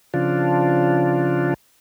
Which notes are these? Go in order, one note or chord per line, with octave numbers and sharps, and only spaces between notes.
C#3 F3 D4 F4